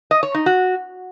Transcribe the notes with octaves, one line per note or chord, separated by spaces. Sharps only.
D#5
C#5
D#4
F#4